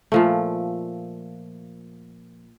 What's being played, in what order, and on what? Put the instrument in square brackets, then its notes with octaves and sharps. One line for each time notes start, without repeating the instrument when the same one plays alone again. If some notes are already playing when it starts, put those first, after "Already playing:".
[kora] A#2 F3 A3